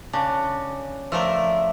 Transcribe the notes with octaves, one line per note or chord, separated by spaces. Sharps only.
C#3 D4
F3 A3 A#4 D5 E5